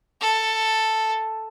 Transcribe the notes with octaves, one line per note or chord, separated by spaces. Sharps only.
A4